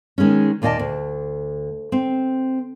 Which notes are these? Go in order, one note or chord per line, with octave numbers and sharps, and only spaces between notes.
D#3 G#3 B3 C#4
D#2 A#2 A#3 D5 D#5 A5
D2
C4